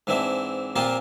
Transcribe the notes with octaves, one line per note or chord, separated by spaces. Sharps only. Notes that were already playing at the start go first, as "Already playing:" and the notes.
G#2 E3 C4 D4 E5
A#2 F3 A#3 C4 F4 G4